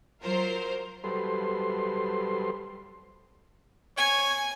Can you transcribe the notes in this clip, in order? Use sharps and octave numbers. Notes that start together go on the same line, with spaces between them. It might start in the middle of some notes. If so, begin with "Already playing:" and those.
F#3 F4 A#4 C5
F#3 G3 A4 B4 C5 C6
C#5 G#5